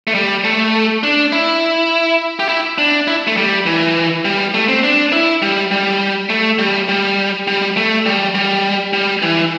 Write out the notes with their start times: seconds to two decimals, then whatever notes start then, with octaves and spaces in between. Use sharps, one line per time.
0.07 A3
0.14 G3
0.44 A3
1.03 D4
1.32 E4
2.39 G4
2.49 E4
2.78 D4
3.08 E4
3.27 A3
3.37 G3
3.66 E3
4.25 G3
4.54 A3
4.68 C4
4.84 D4
5.13 E4
5.42 G3
5.71 G3
6.29 A3
6.59 G3
6.89 G3
7.47 G3
7.77 A3
8.06 G3
8.35 G3
8.93 G3
9.22 E3